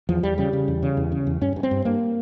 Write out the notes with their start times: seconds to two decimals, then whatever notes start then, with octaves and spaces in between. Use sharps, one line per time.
0.09 E2 F3
0.23 E2 G3
0.38 C#3 G3
0.53 C#3
0.68 E2
0.82 C#3
0.97 E2
1.12 C#3
1.27 E2
1.41 G2 C#4
1.56 G2
1.63 C4
1.71 G2
1.85 G2 A#3